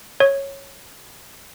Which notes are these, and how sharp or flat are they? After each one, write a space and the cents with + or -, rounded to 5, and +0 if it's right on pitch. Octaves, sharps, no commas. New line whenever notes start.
C#5 -10